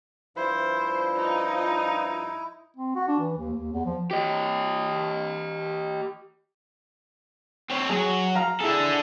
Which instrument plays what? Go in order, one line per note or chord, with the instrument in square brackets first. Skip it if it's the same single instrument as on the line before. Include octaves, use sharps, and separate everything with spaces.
[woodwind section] G2 F3 [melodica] E4 [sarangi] C5
[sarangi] D#4
[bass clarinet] C4
F#4
D4
E3
D#2
D#2
E2
F3
[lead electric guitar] G4 D#5
[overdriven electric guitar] C4 C#5
[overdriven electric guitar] F#3 [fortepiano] G#4
[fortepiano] F5 A#5
[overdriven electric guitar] D4 A4 [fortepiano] E4 G#4